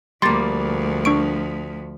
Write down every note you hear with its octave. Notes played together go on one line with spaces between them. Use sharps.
D2 F3 G3 A#3 C6 A6
D4 C#6 D7